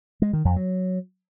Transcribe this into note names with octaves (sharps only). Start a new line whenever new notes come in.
G#3
D#3
F2
F#3